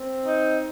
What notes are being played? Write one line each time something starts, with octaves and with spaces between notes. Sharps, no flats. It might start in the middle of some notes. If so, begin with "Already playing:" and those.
Already playing: C4
D#4